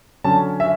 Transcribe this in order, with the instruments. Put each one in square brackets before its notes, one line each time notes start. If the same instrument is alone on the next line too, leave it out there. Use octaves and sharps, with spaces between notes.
[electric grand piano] D3 F#3 C#4 [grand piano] A5
[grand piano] E5